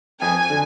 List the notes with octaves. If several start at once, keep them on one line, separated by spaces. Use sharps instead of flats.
F2 G#5
D3